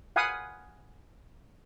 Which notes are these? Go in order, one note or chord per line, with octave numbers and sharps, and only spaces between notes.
F5 F#5 G#5 B5 D#6